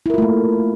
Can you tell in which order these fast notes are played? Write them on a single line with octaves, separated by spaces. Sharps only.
E4 A#4 F4 A3 A#3